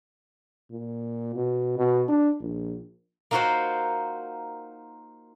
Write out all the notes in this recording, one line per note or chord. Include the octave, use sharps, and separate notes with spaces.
A#2
B2
B2
D4
A#1
A#3 D#4 F4 F#4 C5 F#5